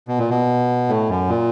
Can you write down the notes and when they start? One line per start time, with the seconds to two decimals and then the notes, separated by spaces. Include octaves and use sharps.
0.08 B2
0.19 A#2
0.30 B2
0.89 A2
1.09 F#2
1.29 A#2